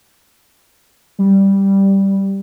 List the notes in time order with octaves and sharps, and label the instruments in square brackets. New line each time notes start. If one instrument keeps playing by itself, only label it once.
[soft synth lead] G3